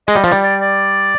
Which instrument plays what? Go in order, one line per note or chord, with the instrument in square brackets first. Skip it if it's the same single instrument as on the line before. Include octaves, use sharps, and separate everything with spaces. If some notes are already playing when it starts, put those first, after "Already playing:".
[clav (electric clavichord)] G#3 [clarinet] D#5
[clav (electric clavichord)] G3
[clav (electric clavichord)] F3 [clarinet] D5
[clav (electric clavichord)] G3
[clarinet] D5
D5